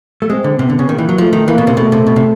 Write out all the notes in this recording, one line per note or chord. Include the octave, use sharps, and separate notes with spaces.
A3
G#3 C4
D3
C3 B3
D3
C#3
D#3 A#3
E3
F#3
F3 A3
D#3
E3 A#3
B2
C3
B2 A3
C3
B2
C3